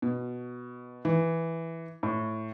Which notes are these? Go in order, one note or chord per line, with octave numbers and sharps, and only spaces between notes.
B2
E3
A2